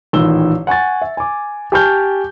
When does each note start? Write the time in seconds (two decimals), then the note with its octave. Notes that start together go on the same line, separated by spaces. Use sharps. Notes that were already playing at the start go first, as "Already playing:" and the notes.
0.13 A1 A#2 D#3 E6 G7
0.67 F#5 G#5 C#6 A6
1.02 E5
1.17 G#5 D6
1.72 G4 G#5 A5 C#6 F6 G6